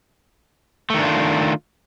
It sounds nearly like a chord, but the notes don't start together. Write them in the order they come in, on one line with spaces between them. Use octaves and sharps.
A3 D#3 D4 F4